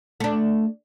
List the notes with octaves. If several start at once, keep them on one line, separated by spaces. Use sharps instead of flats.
A3 D4